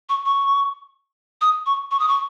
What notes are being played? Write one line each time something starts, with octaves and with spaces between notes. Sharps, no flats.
C#6
C#6
D#6
C#6
C#6
D#6
C#6